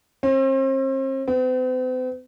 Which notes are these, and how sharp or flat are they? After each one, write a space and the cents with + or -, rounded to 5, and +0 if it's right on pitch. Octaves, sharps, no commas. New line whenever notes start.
C4 +40
C4 -45